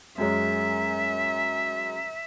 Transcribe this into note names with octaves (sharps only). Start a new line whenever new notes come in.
F#2 G#3 C#4 E5